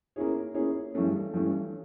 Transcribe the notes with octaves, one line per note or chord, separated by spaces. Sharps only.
A#3 C#4 E4 G#4 C#5
A#3 C#4 E4 G#4 C#5
G2 E3 A3 C#4
G2 E3 A3 C#4